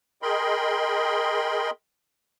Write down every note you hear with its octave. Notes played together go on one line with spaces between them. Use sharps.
G#4 A#4 D#5 G5 B5 C6